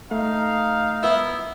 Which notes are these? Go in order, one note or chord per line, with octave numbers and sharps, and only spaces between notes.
A3 D#4 F5
B3 E4